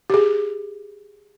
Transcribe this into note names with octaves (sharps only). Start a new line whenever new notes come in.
G4 G#4